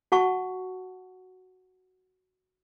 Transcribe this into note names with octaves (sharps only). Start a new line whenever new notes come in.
F#4 F#5 A5 C#6